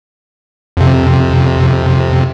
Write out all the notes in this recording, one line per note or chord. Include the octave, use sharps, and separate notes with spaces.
F2 C3